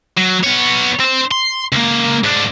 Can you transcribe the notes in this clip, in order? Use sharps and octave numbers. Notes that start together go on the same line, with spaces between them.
F#3
B3 C#5
C4 C5
C6
C#2 A#3
G#2 D4